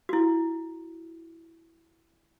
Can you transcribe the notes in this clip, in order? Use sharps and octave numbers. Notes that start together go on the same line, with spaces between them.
E4 F#4